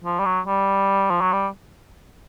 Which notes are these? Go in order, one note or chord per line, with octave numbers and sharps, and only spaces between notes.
F3
G3
F#3
G3
F3
F#3
G3